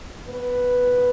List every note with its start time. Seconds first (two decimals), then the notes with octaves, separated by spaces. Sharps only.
0.27 B3 B4
0.80 A#2